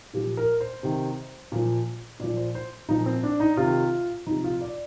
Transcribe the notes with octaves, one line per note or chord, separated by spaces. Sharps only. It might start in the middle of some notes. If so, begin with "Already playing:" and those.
A#2 F3 G4
A#4
C5
C3 D#3
A#2 F3
A#2 F3 D5
C5
C5
A#2 F3 D#4
C4
D4
D#4
C3 F4
D#3
C3 F3 D#4
F4
D5